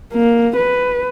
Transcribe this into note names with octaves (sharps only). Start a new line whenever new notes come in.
A#3
B4